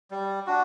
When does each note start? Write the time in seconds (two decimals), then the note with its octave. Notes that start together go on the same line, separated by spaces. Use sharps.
0.11 G3
0.47 D4 F#4